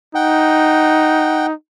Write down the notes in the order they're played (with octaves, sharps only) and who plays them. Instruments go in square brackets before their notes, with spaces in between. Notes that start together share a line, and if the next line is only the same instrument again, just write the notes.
[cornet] D#4 [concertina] F#5 G5